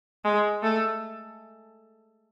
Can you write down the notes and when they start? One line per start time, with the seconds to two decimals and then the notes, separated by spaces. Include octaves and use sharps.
0.25 G#3
0.63 A3